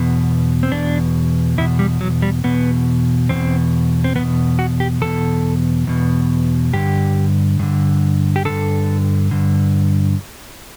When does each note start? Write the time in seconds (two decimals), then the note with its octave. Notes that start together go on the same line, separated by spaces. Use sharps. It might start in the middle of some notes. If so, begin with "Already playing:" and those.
Already playing: E2 B2
0.63 C4
0.71 E2 B2 D4
1.58 E2 B2 E4
1.79 G3
2.01 F#3
2.22 G3
2.44 E2 B2 B3
3.29 E2 B2 C4
4.04 C4
4.16 E2 B3
4.19 B2
4.59 F#4
4.80 G4
5.01 E2 B2 A4
5.87 E2 B2
6.73 G2 D3 G4
7.59 G2 D3
8.36 G4
8.45 G2 D3 A4
9.31 G2 D3